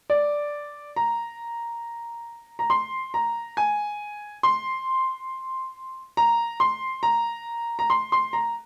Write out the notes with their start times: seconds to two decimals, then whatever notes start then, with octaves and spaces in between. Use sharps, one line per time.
0.10 D5
0.96 A#5
2.59 A#5
2.70 C6
3.14 A#5
3.57 G#5
4.43 C6
6.17 A#5
6.60 C6
7.03 A#5
7.79 A#5
7.90 C6
8.12 C6
8.33 A#5